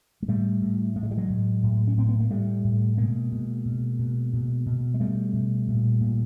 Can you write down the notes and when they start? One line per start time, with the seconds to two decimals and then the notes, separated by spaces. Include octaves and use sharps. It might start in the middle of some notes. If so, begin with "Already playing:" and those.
0.22 G#3
0.28 A2 G3 A3
0.62 A2
0.96 A2 A3
1.03 G#3
1.11 G3
1.18 F#3 G#3
1.29 A2
1.63 A2
1.88 C#4
1.97 A2 C4
2.09 B3
2.20 A#3
2.30 A2 G3 A3
2.64 A2
2.97 B2 G#3 A#3
3.32 B2
3.65 B2
3.99 B2
4.33 B2
4.66 B2
4.94 G#3
5.00 B2 G3 A3
5.33 B2
5.68 A#2
6.01 A#2